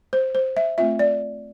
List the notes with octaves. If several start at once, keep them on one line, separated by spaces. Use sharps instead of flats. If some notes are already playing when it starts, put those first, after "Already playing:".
C5
C5
E5
A3 C4 F4 E5
D5